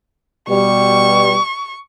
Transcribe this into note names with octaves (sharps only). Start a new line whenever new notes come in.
B2 G3 C#6